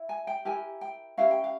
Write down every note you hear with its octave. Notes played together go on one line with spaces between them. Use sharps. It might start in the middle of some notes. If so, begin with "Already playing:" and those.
Already playing: E4
G#5
G5
E4 G4 A#4 G#5
G5
C#4 E4 G4 A#4 F5
G5
F5